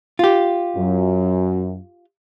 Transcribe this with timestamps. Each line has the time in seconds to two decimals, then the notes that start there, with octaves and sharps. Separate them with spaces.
0.19 F4 G4
0.77 F#2